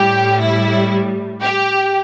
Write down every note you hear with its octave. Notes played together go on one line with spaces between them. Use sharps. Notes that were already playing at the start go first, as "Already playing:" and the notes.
Already playing: A2 G3 G4
E4
G4